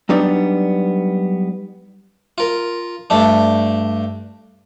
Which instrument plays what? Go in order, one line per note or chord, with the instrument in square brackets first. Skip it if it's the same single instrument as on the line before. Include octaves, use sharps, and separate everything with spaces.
[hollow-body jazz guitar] F#3 G3 B3 D4 D#4
[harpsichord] F4 A#4
G2 A3 D4